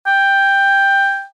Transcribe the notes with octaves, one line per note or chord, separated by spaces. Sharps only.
G5